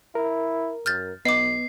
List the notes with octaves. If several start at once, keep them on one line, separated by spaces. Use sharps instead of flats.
E4 A#4
F#2 F6 G6 A6
B1 B3 D#5 D6 C7